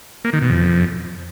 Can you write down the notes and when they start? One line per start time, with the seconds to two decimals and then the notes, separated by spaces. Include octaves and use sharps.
0.25 A#3
0.33 D#3
0.42 B2
0.50 F2